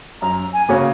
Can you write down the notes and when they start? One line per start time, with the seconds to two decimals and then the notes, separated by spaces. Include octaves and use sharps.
0.22 F#2 A#5
0.53 G#5
0.69 C#3 A#3 F#4 C#5